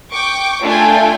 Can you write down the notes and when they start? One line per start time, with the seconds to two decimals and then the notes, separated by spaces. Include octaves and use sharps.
0.11 G5 C#6 D6
0.63 A3 D4 F4 A4 G5 G#5